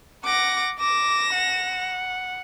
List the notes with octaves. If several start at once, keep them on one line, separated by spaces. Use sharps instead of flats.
F#5 D6 A#6
D6 A#6 E7
F#5